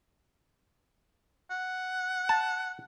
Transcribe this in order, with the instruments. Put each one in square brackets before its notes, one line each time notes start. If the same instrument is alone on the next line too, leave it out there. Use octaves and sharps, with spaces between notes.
[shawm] F#5
[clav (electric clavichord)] A5